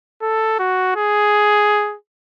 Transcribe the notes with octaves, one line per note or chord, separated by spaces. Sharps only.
A4
F#4
G#4